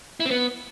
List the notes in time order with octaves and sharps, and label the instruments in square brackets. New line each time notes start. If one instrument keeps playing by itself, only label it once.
[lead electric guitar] E4
C4
B3